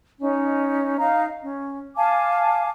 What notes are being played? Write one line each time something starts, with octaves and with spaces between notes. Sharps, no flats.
C#4 D#4
D#4 F5 A#5
C#4
F5 G#5 A5 D6